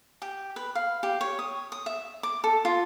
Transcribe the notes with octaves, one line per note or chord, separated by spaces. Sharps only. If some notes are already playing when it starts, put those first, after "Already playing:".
G4
B4
F5
G4
C#5
D#6
D#6
E5
D6
A4
F4